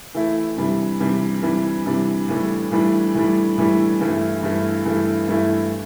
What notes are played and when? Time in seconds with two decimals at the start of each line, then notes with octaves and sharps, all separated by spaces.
0.14 E3 A3 E4
0.57 C3 E3 G3 D4
1.00 C3 E3 G3 D4
1.42 C3 E3 G3 D4
1.86 C3 E3 G3 D4
2.28 A2 E3 G3 D4
2.71 A2 E3 G3 D4
3.14 A2 E3 G3 D4
3.58 A2 E3 G3 D4
4.00 G2 E3 A3 E4
4.43 G2 E3 A3 E4
4.85 G2 E3 A3 E4
5.28 G2 E3 A3 E4